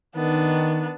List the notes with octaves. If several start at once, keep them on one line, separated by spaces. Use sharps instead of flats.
D#3 B3 D4